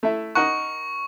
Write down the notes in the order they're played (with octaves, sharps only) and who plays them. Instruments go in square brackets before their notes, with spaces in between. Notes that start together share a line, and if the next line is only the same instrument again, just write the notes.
[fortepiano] A3 E4
[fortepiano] D#4 A#4 F#5 [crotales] C#6